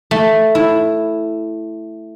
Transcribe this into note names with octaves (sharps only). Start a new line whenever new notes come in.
A3
E4